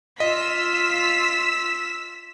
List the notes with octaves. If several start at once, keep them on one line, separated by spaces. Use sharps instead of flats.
F4 D#5 E6 B6